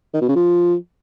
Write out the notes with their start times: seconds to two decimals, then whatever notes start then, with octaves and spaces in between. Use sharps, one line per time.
0.14 D#3
0.21 B2
0.28 C#3
0.36 F3